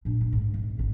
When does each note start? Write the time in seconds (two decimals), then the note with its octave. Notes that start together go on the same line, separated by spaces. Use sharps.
0.05 A#2 D4
0.21 G3
0.33 G#2
0.54 G#1
0.77 G#1 F2